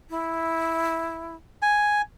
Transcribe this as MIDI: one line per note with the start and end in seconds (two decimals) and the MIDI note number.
0.10 1.36 64
1.62 2.02 80